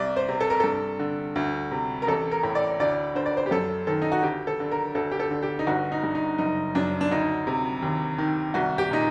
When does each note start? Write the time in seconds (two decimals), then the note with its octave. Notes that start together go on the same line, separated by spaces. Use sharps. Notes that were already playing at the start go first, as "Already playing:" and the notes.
Already playing: C2 D5
0.16 C5
0.29 C3
0.40 A4
0.50 A#4
0.60 G2 A4
0.99 D3
1.36 D2
1.71 C3
2.02 A#4
2.07 A1 A4
2.31 A#4
2.43 A2
2.55 D5
2.80 D2 D5
3.15 D3 C5
3.26 D5
3.37 C5
3.46 G4
3.51 F#2 A4
3.87 D#3 A4
4.02 D#4
4.12 F#4
4.23 D2 G4
4.47 A4
4.60 D3
4.71 A#4
4.95 D2 A4
5.11 G4
5.20 A4
5.31 D3
5.43 G4
5.59 D#4
5.67 G1 F#4
5.92 D#4
6.03 G2
6.15 D#4
6.38 F#1 D#4
6.75 F#2 D4
7.01 D4
7.11 D2 D#4
7.47 C3
7.82 D#2
8.18 D#3
8.54 C2 F#4
8.78 G4
8.91 A#2 D#4